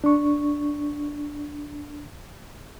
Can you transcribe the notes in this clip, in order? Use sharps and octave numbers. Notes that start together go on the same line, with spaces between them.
D4 C#6